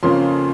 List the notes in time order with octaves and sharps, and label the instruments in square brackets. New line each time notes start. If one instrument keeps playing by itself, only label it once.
[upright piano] F2 C#3 F3 A#3 C#4 C6